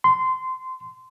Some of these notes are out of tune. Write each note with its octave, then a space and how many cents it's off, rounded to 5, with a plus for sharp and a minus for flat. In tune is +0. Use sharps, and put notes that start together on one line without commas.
C6 -20